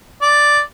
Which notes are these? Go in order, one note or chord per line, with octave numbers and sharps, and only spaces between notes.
D5